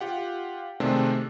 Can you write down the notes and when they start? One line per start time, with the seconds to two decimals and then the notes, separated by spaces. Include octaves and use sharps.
0.01 F4 G4 F#5
0.80 C3 D#3 G#3 A3 C4 D4